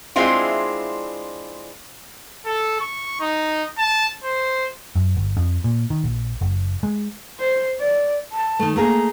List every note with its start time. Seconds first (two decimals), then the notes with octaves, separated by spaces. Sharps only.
0.16 G#3 C4 D4 E4 F4
2.46 A4
2.81 C#6
3.20 D#4
3.79 A5
4.24 C5
4.96 F#2
5.17 G1
5.37 F2
5.64 A#2
5.90 D#3
6.04 A#1
6.41 F#1
6.83 G#3
7.39 C5
7.79 D5
8.32 A5
8.59 D#3 A3
8.76 A3 A#3 G#4 A#5